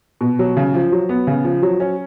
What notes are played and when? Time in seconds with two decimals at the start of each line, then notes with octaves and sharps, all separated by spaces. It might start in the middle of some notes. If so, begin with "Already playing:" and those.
0.21 B2
0.39 F#3
0.57 C#3
0.74 F3
0.92 F#3
1.09 B3
1.27 C#3
1.45 F3
1.62 F#3
1.80 C#4